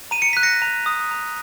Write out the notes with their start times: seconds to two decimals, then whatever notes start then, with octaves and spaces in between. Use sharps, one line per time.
0.11 A#5 D#7
0.22 C#7
0.33 F#6 B6
0.43 A#6 C#7
0.62 A#5
0.86 D#6
1.11 A#5